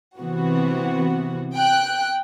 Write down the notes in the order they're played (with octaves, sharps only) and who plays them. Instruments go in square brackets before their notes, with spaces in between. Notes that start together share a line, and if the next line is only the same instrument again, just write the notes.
[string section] C3 E3 B3 F#4
G5 F#6